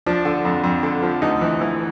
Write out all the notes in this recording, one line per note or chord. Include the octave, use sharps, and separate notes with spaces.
F3 D4
D3
F2
F2
D3
F3
D2 D#4
E3
E3